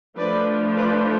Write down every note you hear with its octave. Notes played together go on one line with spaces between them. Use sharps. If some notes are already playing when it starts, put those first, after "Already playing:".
F3 A3 D4 B4 D5
B4 D5